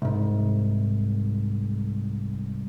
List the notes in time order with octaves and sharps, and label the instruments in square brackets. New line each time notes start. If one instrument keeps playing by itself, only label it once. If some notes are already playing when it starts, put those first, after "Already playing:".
[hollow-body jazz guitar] C2 G#2